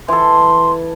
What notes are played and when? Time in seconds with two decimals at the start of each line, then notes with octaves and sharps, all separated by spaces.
0.08 E3 A4 C6